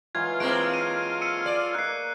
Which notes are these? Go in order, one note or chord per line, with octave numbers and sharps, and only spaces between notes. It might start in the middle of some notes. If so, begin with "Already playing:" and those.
E3 F#3 G#3 F4 G#6
G#3 A#3 C4 A4 B4 C#5 D7
D#7
E6 C#7 D#7
D5
A#3 D#4 F#6 C7